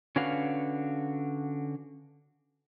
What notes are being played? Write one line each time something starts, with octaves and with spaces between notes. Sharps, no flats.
D3 C#4 D4 F#4 B4 F5